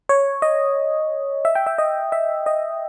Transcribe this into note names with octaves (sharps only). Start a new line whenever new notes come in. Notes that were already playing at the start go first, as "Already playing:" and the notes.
C#5
D#5
E5
G5
E5
D#5
E5
D#5